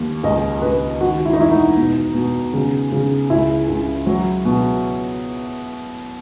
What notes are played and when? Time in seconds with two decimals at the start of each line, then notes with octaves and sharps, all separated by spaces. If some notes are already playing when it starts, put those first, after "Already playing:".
Already playing: D#2
0.23 C#2 D#5
0.62 C#2 B4
1.00 D#3 F#4
1.25 E4
1.33 D#4
1.39 E1 E4
1.52 D#4
1.77 B2
2.15 B2
2.54 C#3
2.92 C#3
3.30 C#2 E4
3.68 C#2
4.07 F#3
4.45 B2